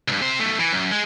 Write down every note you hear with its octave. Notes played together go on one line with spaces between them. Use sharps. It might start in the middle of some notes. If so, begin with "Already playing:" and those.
C#2 G2
C3 C5
B1 A3
E3
F#2
G#3